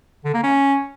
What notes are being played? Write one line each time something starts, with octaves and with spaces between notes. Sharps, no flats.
D3
A#3
C#4